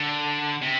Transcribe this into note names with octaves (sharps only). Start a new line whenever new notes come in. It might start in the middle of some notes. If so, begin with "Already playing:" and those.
Already playing: D3
C3